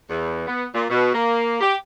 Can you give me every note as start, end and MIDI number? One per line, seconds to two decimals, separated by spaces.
0.09 0.44 40
0.47 0.64 59
0.74 0.85 46
0.90 1.10 47
1.13 1.57 58
1.61 1.75 67